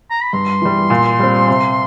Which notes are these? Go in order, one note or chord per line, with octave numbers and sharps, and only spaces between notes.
A#5
B5
G2 C6
E3 G3
A#2
G3 C4
C3